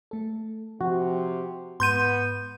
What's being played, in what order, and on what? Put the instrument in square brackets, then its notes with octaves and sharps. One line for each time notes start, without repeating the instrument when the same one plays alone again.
[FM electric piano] A3 A4
[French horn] C3 [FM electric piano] F3 [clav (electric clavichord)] F#4
[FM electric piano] G#2 [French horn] B3 [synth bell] C6 G6 D#7